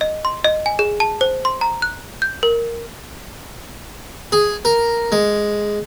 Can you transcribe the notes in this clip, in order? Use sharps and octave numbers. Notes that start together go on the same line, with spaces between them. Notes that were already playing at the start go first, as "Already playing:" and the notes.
D#5
C6
D#5
G#5
G#4
A5
C5
C6
A#5
F#6
G6
A#4
G#4
A#4
G#3